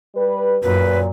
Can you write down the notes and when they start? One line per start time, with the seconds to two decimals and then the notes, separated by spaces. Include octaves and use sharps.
0.15 G3 B4
0.63 F#2 A#2 B4